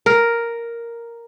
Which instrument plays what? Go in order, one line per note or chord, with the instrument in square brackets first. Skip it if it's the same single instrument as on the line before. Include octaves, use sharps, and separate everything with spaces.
[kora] A#4